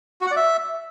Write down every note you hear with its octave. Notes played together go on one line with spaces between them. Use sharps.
F#4
F#5
D5
E5